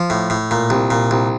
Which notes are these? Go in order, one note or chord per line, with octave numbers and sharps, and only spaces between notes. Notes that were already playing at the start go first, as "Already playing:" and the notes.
Already playing: F3
A2
A2
A#2
C2
A#2
C2